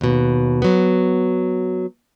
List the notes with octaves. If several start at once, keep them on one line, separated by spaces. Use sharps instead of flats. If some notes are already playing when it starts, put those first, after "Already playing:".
D#2 B2
F#3 B3